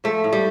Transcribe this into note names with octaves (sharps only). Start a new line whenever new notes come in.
F3 A3
A2
G3